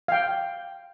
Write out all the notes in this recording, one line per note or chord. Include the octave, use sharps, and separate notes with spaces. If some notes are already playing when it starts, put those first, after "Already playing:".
F5 G5